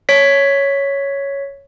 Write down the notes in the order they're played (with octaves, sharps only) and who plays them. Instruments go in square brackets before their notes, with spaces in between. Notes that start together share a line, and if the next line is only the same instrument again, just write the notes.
[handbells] C#5 B6